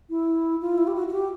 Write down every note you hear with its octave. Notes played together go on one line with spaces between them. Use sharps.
E4
F4
E4
G4
F#4
F#4
G4